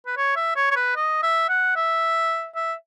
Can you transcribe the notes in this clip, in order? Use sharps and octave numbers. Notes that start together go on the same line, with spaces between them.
B4
C#5
E5
C#5
C#5
B4
D#5
E5
F#5
E5
E5